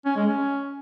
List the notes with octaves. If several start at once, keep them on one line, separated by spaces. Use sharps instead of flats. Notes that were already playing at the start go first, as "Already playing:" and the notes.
C#4
G#3
C#4